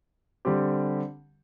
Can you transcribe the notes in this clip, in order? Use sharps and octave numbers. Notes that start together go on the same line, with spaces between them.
D3 G3 C4 G4